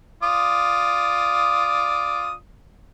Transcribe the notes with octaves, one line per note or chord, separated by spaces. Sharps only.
F4 D5 D#6